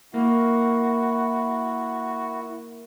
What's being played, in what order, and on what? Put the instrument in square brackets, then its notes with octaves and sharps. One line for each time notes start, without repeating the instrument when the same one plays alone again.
[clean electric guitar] A#3 [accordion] E4 [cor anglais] F#4